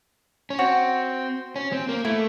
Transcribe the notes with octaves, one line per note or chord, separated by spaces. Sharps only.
C#4
C4 F#4
C#4
C4
A#3
A3 E4